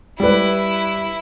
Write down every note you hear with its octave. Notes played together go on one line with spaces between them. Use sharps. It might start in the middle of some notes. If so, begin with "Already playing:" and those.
G3 E4 B4